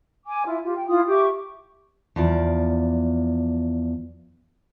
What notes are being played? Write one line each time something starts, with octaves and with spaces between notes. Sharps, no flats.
G#5 D6
E4 F4
F4 G4
G5
E4 F4 D#6
G4 E5 C#6 D6
E2 F3 D5